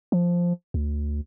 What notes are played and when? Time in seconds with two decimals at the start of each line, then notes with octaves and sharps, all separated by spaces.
0.12 F3
0.74 D2